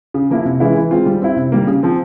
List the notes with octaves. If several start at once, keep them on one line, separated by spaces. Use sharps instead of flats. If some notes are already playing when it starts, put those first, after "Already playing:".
C#3
F3 A#3 E4
C3
E3 G#3 C#4 E4
E3
G#3 C4 F4
G3
C4 E4
C3
G3 A#3
C#3
F3 C4